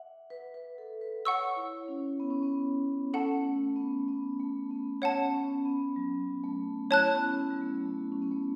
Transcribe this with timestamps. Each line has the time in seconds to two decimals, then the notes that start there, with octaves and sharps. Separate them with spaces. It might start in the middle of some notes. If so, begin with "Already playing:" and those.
Already playing: E5 F#5
0.30 B4
0.54 B4
0.78 A4
1.01 B4
1.25 C#5 F#5 C#6 E6
1.56 E4
1.76 E4
1.88 C#4
2.20 B3
2.30 C#4
2.43 B3
3.14 C#4 A4 F#5 A5
3.45 A3
3.76 B3
4.08 B3
4.39 A3
4.71 B3
5.02 C#4 C#5 F#5 A5
5.24 B3
5.34 C#4
5.65 B3
5.96 F#3
6.43 A3
6.90 E4 C#5 A5 F#6
7.07 B3
7.14 C#4
7.38 B3
7.51 F#3
7.62 A3
7.78 F#3
7.85 A3
8.12 C#4
8.22 B3
8.31 A3